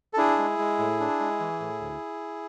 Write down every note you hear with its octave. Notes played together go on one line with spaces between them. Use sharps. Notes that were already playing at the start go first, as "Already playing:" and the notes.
A4
D4 E4 G#4
G#3
G#3
A2
D4
G#3
E3
A2
D2